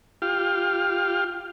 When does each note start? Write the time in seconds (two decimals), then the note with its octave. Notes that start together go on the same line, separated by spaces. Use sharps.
0.22 F4 G4 F6